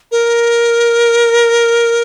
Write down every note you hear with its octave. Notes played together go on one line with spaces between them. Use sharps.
A#4